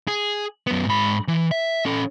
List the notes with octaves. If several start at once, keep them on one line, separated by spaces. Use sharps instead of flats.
G#4
F#2 B3
G#2 B5
E3
E5
C#4 A4